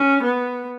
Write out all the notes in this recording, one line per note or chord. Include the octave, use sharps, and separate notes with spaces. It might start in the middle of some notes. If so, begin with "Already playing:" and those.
Already playing: C#4
B3